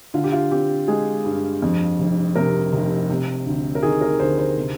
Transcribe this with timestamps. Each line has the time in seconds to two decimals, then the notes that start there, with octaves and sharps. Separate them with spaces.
0.14 D3 F4
0.24 G4
0.32 F4
0.51 C4 G4
0.88 G#3 G#4
1.25 G2
1.62 F2
1.99 F1
2.36 C3 A#4
2.73 F1
3.09 C3
3.46 D2
3.75 A#4
3.83 D#3 G#4
4.01 A#4
4.19 D2 C5
4.38 C5
4.57 C3